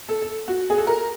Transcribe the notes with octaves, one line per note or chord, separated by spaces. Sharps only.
A4
A4
F#4
G#4
A4
A#4